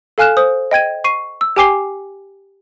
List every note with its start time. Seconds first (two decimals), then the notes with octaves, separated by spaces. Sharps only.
0.18 A4 F5 G#5 F6 F#6 E7
0.37 C5 D#6
0.71 D#5 G5 G#6 D#7
1.04 C#6 C7 D#7
1.41 E6
1.56 G4 G5 G#5 D6 C7 G7